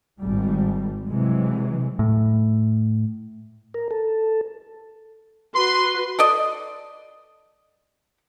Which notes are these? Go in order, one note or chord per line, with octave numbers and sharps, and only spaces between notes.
G#1 G3 G#3
C3 E3 F#3 G#3
A2
A#4
A4
F#4 B4 C6
A4 D5 D#5